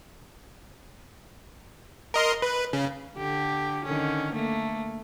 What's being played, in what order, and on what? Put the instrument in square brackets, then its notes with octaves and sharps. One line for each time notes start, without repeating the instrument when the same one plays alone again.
[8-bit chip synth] A#4 D#5 C6
B4
C#3
[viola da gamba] D3 G4
D3 D#3 C#4
A3 A#3